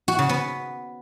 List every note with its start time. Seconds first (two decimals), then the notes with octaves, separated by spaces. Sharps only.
0.08 F#4
0.19 C#3
0.29 B3